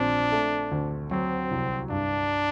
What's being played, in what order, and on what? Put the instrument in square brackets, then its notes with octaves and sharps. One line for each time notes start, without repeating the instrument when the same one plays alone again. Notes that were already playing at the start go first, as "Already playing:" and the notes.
Already playing: [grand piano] A#1 C4 [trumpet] D4
[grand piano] A3
D2
[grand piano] F#3 [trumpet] C4
[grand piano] C2
[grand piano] G2 [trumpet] D4